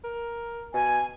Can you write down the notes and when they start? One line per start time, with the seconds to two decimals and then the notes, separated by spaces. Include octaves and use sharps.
0.04 A#4
0.74 B2 G#5